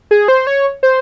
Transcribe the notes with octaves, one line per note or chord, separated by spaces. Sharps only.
G#4
C5
C#5
C5